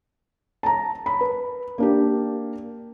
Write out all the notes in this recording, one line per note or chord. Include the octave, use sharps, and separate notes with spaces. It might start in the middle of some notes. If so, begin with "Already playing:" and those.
A5 A#5
B5
B4
A#3 D4 G4